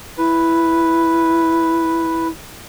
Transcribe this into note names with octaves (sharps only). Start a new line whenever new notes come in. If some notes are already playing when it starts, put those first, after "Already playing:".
E4 B4